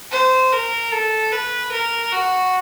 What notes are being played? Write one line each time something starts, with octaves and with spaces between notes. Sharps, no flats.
C5
A#4
A4
B4
A#4
F#4